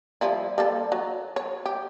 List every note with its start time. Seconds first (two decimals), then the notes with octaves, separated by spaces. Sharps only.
0.21 F3 G3 E4
0.58 G3 A#3 A4
0.92 F#3
1.36 C#5
1.66 G4